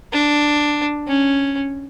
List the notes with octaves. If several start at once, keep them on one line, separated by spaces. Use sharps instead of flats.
D4
C#4